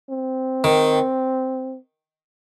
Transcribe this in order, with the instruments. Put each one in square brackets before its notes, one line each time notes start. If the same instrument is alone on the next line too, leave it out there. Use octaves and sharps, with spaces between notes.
[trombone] C4
[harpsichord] D#3